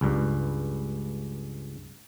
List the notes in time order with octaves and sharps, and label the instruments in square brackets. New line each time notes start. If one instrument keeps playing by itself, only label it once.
[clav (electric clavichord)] C#2 G2